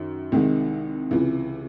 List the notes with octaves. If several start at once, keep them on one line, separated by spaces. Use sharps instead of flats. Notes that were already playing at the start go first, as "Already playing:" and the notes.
Already playing: F#2 D#3
C2 C3 D#3 G#3
C#2 C3 E3